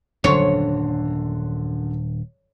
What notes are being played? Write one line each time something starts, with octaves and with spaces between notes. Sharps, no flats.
D#1 F#2 D3 D4 C#5 C6